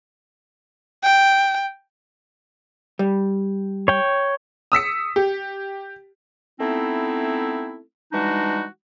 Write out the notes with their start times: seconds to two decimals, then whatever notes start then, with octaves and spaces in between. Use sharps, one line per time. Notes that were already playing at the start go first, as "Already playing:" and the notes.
1.03 G5
2.99 G3
3.88 C#5 G5
4.72 D#6 E6 B6 C#7
5.16 G4
6.60 A3 B3 C4 D#4 E4
8.12 E3 G3 G#3 D4 D#4 F#4